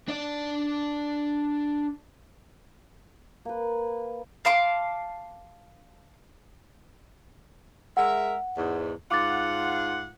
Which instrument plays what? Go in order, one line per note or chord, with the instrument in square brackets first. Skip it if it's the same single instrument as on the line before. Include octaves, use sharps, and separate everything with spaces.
[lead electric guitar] D4 D5
[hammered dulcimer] A#3 B4
[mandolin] F5 A5 C6 D6
[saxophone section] G#3 A#4 E5 [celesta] F#5
[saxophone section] E2 G#2
[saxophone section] G#2 F4 F#5 [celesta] D6 A6